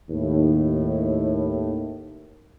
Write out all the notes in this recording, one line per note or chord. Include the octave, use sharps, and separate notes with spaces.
D#2 A2